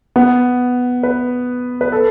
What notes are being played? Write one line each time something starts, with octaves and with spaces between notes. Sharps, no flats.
B3
B4
B4
A4